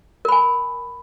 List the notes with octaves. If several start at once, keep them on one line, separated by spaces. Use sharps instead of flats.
A#4 G#5 B5